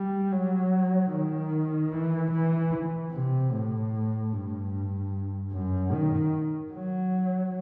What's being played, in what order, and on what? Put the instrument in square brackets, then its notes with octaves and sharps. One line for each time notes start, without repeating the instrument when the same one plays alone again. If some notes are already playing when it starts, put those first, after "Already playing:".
Already playing: [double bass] G3
F#3
D#3
E3
E3
C3
A2
G2
F#2
D#3
F#3